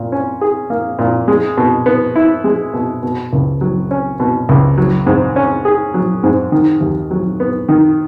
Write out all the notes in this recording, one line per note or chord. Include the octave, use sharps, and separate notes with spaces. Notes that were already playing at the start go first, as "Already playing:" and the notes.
Already playing: A#2
C#4
G#4
A#3
A#2
G#3
B2
B3
E4
G#3
B2
B2
C#2
F#3
C#4
B2
C#2
F#3
G#2
C#4
G#4
F#3
G#2
D#3
D#2
F#3
B3
D#3